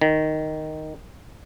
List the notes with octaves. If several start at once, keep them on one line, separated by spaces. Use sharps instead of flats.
D#3